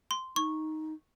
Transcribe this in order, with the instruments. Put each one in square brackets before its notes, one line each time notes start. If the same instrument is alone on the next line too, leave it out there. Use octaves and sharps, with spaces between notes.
[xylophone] C6
[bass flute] D#4 [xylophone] C#6